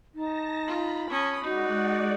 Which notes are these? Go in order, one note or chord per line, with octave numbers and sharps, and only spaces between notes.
D#4 A5 A#6
F4 B5
C#4 A5 D#6
G#3 D#4 F#4 D5 F#5